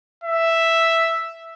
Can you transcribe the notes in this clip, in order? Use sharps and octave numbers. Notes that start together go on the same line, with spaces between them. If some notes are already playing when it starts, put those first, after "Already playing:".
E5